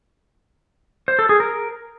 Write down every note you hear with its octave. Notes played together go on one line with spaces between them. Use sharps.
C5
A4
G#4
A#4